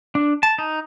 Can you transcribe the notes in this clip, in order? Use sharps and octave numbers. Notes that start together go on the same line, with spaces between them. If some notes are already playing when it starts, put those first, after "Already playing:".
D4
A5
D#4